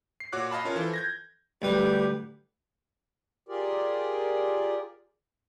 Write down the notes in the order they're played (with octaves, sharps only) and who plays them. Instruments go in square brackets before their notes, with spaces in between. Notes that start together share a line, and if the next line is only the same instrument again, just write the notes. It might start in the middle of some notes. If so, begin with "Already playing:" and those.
[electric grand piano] C7
A#2 F#4 C#5 D6 F#6
D#5 F5 A5 B5
C#4 F4 A#4 C#5
E3 F3 A4
G6 G#6 A#6
[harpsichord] D2 G3 B4 [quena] G4
[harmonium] F4 G4 G#4 A#4 D5